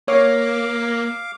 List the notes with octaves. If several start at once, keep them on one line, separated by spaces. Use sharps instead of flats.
A#3 C#5 F5 D6